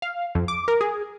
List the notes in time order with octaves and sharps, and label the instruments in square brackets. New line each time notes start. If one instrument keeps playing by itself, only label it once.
[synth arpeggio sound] F5
F2
D6
A#4
G#4